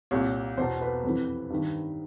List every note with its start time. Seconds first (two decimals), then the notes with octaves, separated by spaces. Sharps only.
0.11 C2 A#2 C#5
0.57 E2 B2 C5
0.81 B4
1.04 F2 C3 E3
1.50 G2 D#3